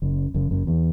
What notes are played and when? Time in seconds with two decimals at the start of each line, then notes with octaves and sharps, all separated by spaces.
0.02 F#1 F#2
0.34 F#1 F#2
0.51 F#1 F#2
0.67 E2